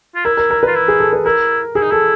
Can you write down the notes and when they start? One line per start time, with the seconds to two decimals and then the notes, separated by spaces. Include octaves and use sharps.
0.16 F4
0.25 E4 A#4
0.37 A#4
0.50 A#4
0.63 B4
0.67 F4
0.76 E4
0.88 G#4
1.00 A4
1.13 B4
1.25 E4 A#4
1.75 E4 G#4
1.82 D#4
1.91 E4 A4